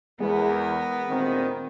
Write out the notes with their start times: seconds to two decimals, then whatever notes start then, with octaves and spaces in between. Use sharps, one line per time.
0.20 E2 G#3 B3 A#4
1.09 D2 A#2 D#3 C4